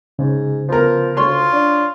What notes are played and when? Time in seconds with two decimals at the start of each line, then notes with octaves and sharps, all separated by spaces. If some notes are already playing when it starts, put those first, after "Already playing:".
0.19 G#2 C#3
0.69 F3 B3 A#4
1.17 D2 F4 C#5 C6
1.53 D4